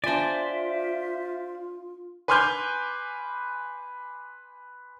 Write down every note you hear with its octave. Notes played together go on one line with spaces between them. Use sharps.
D4 F4 C5 D5 E5 G#5
B4 G#5 C6 D6 F6 G6